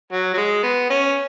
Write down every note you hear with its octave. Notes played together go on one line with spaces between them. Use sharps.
F#3
F#3
G#3
B3
C#4